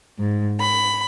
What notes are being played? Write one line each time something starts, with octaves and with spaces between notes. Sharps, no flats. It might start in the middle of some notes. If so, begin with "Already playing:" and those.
G#2
B5